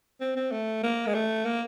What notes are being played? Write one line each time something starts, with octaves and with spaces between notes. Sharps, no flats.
C4
C4
A3
A#3
G#3
A3
A#3